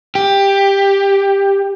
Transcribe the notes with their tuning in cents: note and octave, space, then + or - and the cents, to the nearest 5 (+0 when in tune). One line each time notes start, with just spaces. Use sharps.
G4 +10